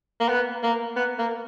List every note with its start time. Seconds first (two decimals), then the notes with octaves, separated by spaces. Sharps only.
0.20 A#3
0.29 B3
0.63 A#3
0.96 B3
1.19 A#3